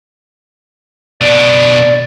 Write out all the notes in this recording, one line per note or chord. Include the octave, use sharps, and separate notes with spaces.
B2 D4 D5